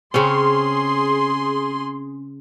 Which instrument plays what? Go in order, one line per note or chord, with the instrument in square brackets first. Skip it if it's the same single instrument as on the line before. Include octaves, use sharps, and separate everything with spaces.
[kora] C#3 C4 C#4 [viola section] G#4 C6